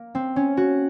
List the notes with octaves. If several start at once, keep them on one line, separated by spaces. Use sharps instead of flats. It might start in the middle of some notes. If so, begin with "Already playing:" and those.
Already playing: A#3
C4
C#4
F#4